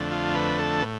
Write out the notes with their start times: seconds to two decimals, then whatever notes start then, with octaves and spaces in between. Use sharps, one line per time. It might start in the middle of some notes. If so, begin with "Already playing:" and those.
Already playing: F2 D3 A3
0.11 F4
0.35 B4
0.59 A4
0.82 A2 B3